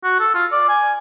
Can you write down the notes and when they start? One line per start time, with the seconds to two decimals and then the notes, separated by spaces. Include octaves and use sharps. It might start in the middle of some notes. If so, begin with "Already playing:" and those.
0.04 F#4
0.20 A4
0.34 F4
0.52 D5
0.69 G#5